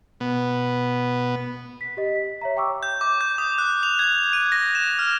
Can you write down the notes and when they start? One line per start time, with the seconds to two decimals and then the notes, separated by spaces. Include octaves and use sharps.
0.20 B2 B3
1.81 B6
1.97 G4 D#5
2.16 B6
2.41 C#5 E5 A#5
2.57 G5 C#6 D6 E6
2.83 G6
3.01 D6
3.21 G6
3.38 D#6
3.58 F#6
3.83 F7
3.99 G#6
4.33 D#7
4.52 A#6
4.75 E7
4.99 F6